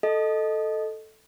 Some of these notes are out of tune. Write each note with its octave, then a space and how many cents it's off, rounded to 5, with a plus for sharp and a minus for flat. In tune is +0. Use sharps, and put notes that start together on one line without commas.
A4 +0 D#5 +0